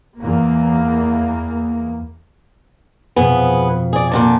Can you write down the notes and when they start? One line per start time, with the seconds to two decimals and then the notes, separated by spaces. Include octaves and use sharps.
0.20 E2 A#3
3.16 F2 B2 B3 G#4
3.93 G#4 D5
4.12 A#2 D3 A5